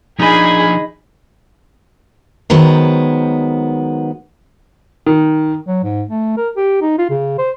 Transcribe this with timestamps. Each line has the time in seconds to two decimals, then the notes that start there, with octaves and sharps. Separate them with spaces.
0.19 F3 D4 D#4 G#4 D#5 B5
2.50 D#3 F#3 G#3 B3 C5
5.06 D#3
5.67 F#3
5.83 G#2
6.09 A3
6.37 A#4
6.57 G4
6.82 D#4
6.98 F4
7.10 C#3
7.38 C5